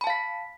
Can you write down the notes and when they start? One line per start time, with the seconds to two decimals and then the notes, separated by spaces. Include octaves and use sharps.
0.01 B5
0.04 A5
0.07 F5
0.10 B6